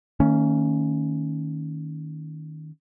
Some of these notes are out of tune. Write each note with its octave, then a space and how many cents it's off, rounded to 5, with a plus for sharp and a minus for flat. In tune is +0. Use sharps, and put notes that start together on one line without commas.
D#3 +0 A#3 -45 C#4 +0